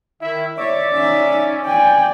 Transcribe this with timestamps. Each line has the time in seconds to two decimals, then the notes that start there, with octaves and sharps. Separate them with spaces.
0.22 D#3 E4 E5
0.58 C#5 D5 E5 D6
0.94 C#4 D#4 E5
1.65 D5 G5 G#5